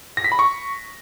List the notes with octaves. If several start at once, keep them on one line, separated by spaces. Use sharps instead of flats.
A#6
B6
B5
C#6